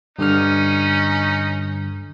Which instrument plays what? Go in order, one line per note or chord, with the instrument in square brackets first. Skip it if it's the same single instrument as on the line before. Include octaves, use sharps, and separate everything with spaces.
[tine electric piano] G2 D3 F6 [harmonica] C#4 D#4